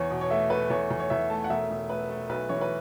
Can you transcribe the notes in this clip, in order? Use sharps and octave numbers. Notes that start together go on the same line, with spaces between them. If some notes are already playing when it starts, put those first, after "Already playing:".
Already playing: E2 C#5
B2
C#5
A3 E5
A3 B4
E2 C#5
E2
C#5
E2 E5
A3 A5
F#5
E1 E5
E1
A3 B4
A3
B1 B4
E3 C#5
B4